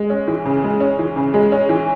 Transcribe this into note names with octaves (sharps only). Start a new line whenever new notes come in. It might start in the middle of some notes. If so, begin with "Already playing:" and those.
Already playing: G#3
C#4
E3
C#3
G#3
C#4
E3
C#3
G#3
C#4
E3